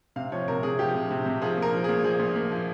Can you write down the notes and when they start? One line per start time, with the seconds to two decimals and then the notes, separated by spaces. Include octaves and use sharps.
0.16 C3 F5
0.32 F3 C#5
0.48 C3 A#4
0.63 C3 G#4
0.79 F3 G4
0.95 C3
1.11 C3
1.26 C3
1.42 F3 G#4
1.57 A#2 A#4
1.74 F3
1.84 G#4
1.89 A#2
2.04 F3 G#4
2.20 A#2
2.36 A#2
2.51 F3